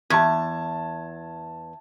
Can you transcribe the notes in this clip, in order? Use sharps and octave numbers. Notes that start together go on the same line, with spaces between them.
E2 A5 G#6